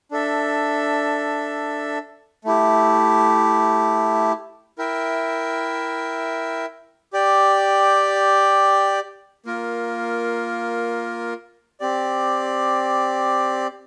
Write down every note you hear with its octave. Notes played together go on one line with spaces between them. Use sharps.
D4 A4 E5
A3 E4 G4
E4 A#4 E5 G5
G4 D5 G5
A#3 F4 A#4
C4 G4 D5